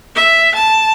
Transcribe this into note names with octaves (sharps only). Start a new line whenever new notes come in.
E5
A5